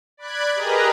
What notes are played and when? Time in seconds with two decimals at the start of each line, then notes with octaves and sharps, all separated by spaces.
0.17 D5 B5 F#6 G#6
0.55 G4 G#4 A#4 B4 D#5 A#5